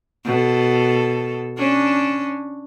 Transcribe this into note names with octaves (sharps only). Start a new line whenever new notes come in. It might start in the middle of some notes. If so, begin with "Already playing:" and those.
B2 A4
C#4 D4